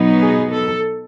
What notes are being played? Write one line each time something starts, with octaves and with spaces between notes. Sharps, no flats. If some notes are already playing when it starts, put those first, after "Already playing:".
Already playing: B2 F#3 B3 D#4
G#4
A4